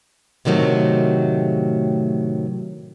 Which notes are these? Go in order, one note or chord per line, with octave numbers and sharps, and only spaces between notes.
A2 C3 D#3 F#3 A3